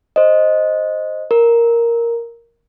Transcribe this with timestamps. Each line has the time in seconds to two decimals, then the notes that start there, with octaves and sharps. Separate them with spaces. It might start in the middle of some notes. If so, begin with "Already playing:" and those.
0.16 C5 D#5
1.31 A#4